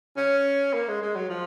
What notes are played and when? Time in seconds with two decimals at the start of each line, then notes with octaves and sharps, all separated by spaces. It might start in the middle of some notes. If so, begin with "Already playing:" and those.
0.17 C#4
0.74 A#3
0.88 G#3
1.02 G#3
1.16 F#3
1.30 F3